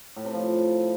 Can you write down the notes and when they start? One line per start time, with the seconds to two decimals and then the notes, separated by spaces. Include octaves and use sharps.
0.16 A2
0.25 C3
0.33 F3